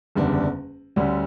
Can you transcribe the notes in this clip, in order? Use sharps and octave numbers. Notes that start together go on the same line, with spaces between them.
F#1 E2 D3 G3 D4
D2 D3 G3 C#4